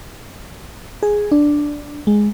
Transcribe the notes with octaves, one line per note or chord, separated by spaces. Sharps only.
G#4
D4
G#3